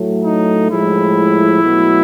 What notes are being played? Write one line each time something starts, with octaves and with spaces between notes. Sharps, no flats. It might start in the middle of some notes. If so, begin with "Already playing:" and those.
Already playing: A2 F#3 A3
D#4
A2 F3 G#3 E4
B2 F#3 A3